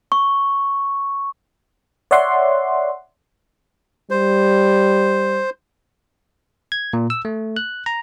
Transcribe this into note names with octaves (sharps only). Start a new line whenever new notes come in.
C#6
C#5 D5 E5 F#5 C6
G3 C5
G#6
A#2
E6
A3
F#6
A#5